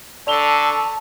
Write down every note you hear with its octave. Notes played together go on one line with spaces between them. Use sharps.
D3 A4 D5 A5 B5 C#6 F7 G7